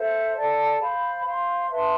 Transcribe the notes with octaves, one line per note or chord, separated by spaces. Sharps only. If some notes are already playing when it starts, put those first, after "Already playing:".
Already playing: A4 C5 E5
A4 D5 A5
C5 F5 B5
C5 F5 C6
B4 E5 A5 C6